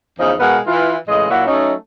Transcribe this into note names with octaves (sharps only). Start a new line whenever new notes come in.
E2 C#3 F3 D#4
B2 G#3 B3 A#4 F5 F#5
E3 F4
A2 C#3 E3 G#3 D#5
A#2 F#3 A#3 E4 C#5 F#5
F#3 A3 C#4 D#4